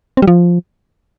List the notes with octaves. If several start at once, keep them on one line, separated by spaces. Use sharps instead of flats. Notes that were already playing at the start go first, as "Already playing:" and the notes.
C4
G3
F3